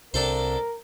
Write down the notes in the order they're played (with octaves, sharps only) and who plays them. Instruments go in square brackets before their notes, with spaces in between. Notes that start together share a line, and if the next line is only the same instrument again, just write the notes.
[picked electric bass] C2 C3 [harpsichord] D4 A4 C5 [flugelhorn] A#4